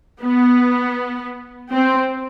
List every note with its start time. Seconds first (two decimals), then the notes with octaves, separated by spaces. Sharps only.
0.22 B3
1.72 C4